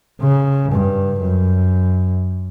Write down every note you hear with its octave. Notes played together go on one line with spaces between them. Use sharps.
C#3
G2
F#2